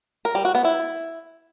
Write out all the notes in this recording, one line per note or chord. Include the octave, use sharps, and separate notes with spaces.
A#4
G3
F#4
B3
E4